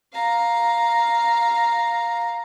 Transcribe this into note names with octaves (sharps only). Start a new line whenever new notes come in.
F5 A#5